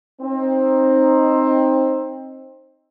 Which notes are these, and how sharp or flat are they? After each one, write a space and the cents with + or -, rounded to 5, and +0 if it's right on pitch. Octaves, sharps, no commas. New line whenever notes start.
C4 +15 D#4 +0